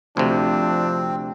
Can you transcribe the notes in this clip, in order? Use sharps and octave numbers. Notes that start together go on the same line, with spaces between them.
D2 C3 F3 C4 D4